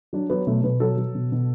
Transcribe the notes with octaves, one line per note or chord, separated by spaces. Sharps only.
F#3 D4
F#3 B3
B2 A3
B2 B4
F#3 A4
F#3
B2
B2